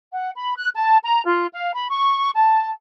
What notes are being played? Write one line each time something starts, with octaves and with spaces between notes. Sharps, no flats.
F#5
B5
F#6
A5
A#5
F4
F5
B5
C#6
A5